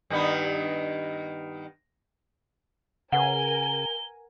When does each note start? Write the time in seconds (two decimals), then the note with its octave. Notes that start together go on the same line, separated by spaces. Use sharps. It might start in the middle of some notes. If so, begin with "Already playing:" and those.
0.10 G2 D#3 B3
3.12 C#3 A#4 B4 F#5 G#5 G7